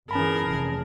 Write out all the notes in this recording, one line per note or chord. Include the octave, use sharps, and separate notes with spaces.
G1 E3 C#4 G#4 A#4 A5 B5
F1